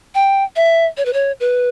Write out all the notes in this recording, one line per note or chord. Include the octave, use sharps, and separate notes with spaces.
G5
E5
C#5
B4
C#5
B4